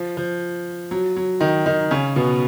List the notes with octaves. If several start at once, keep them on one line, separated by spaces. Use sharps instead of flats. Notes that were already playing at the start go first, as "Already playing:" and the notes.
Already playing: F3
F3
F#3
F#3
D#3 D#4
D#3 D#4
C#3 C#4
B2 B3